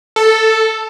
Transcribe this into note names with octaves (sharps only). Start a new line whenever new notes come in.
A4